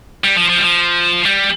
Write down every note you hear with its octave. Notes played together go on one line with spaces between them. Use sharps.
G3
F3
F3
G3
F3
G3